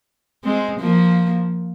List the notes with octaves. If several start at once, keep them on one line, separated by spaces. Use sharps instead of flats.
G#3 C4
F3 A#3